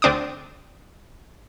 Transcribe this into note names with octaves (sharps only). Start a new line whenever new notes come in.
D2 C4 D4 D6 D#6